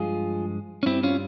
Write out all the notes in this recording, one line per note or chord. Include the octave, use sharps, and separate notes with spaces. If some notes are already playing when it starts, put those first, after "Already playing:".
Already playing: G2 F3 G#3 F4 G#4
C#4
G2 G3 C4 E4
C#4 F4